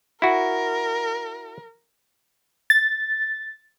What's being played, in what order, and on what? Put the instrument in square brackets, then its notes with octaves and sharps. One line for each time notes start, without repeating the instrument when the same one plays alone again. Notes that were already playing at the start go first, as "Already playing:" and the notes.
[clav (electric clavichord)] E4 F#4 [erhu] A#4
[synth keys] A6